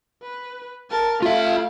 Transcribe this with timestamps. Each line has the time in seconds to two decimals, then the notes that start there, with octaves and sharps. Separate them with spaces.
0.22 B4
0.90 A#4 A5
1.22 A3 F4 E5 F5